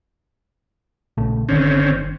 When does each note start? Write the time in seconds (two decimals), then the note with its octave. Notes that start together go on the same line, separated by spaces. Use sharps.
1.18 A#1 C#3 A3
1.49 G1 D3 D#3 C4 C#4